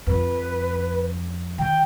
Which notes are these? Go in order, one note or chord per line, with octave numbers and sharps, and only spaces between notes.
F2 B4
D#3 G5